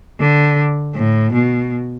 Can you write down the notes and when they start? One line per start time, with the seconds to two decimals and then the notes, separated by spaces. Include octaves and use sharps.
0.20 D3
0.95 A2
1.33 B2